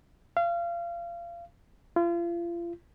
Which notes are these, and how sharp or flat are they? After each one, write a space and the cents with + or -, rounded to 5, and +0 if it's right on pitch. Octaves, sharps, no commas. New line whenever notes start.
F5 -30
F4 -35